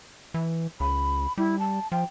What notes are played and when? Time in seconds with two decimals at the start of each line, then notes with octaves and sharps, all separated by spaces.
0.34 E3
0.80 C#2 B5
1.38 G3 E4
1.59 A5
1.92 F3 G5